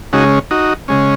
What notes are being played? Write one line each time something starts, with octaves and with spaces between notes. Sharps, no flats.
C#3 G#3 C#4 D#4 F#4
D#4 F#4
C#3 G#3 C#4